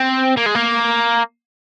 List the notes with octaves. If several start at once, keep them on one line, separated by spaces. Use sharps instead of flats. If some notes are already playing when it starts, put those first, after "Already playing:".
Already playing: C4
A#3
G#3
A#3